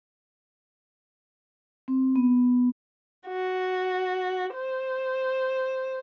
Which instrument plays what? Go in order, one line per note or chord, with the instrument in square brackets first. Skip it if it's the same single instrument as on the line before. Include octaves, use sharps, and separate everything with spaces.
[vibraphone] C4
B3
[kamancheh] F#4
C5